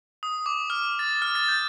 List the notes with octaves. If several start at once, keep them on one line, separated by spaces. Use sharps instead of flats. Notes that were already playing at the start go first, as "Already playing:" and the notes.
D#6
D6
F6
A6
F6
A6
G6